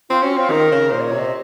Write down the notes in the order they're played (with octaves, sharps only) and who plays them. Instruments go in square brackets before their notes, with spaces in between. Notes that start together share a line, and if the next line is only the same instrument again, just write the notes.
[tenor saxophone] C4 [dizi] F4
[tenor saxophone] C#4 [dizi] F#4
[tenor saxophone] C4 [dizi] F4
[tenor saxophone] D#3 [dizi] A#4
[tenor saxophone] C#3
[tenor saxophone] A#2 [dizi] C5
[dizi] D#5
C#5
[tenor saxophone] C3
[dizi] D#5